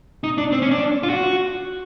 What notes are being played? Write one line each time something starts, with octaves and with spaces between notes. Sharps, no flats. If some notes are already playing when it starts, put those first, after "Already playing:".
D#4
D4
C4
C#4
D4
F4
F#4